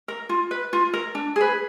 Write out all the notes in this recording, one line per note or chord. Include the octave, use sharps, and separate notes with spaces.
A#4
F4
B4
F4
A#4
D4
G#4 B4